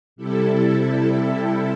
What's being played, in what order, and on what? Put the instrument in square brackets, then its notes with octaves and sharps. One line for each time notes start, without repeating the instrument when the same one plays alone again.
[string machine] C3 G3 E4 A4